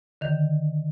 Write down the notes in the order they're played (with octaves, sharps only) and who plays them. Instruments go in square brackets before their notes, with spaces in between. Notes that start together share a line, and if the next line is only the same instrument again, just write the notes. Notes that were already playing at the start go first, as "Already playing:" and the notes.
[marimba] D3 D#3